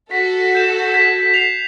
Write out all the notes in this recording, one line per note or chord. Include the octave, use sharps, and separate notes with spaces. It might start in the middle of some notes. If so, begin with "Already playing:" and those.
F#4 A4 B6
G6 E7
G#6 B6
B6 C7 F7